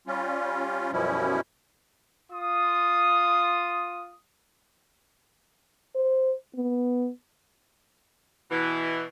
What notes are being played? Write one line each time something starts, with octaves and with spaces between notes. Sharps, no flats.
G3 C#4 F4
F#2 B2 F3 G3 C#4 E4
F4 D#6
C5
B3
B2 E3